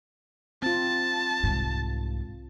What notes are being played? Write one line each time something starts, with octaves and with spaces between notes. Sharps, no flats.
C4 F4 A5
C2 G#2